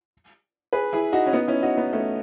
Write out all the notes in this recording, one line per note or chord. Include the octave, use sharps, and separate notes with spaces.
G#4 B4
E4 G#4
D#4 F#4
C#4
B3 D#4
C#4 E4
D#4 F#4
B3 D#4
A3 C#4